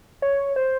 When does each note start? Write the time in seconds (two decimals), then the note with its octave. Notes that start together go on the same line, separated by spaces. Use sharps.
0.22 C#5
0.56 C5